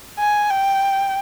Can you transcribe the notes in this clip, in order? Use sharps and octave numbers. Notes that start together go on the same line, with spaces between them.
G#5
G5